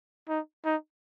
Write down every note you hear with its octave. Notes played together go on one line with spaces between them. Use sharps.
D#4
D#4